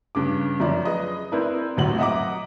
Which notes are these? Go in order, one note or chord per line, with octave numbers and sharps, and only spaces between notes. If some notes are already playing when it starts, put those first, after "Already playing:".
G2 C#3 D6
F#2 F3 C#4 D5
G#4 B4 D#5
C4 E4 A#4 B4 D5
D#1 A1 C3 F#3 F#4 F#7
D#5 E5 F#5 A#5 D6